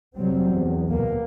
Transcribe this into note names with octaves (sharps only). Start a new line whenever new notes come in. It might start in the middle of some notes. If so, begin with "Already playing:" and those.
F1 F#3 G3 C4
E2
D2 B2 A#3